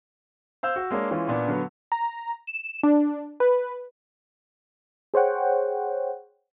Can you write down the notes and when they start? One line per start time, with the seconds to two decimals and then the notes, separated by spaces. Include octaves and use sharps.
0.63 C5 F5 E6 G6
0.76 F#4
0.91 G#3 A#3 D4 C#5
1.11 E3 G#3 C#4 F4
1.28 A#2 B3 D4
1.48 D3 F#3 B3
1.92 A#5
2.47 E7
2.83 D4
3.40 B4
5.14 G#4 C5 C#5 F#5 G5